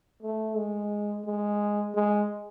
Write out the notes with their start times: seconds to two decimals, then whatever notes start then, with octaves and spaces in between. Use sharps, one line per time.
0.22 A3
0.56 G#3
1.26 G#3
1.94 G#3